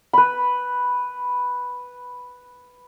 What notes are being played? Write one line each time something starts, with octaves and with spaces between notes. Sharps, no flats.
B4 B5